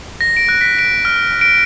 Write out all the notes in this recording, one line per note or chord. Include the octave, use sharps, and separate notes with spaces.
A#6
D7
F#6
B6
D7
F6
D7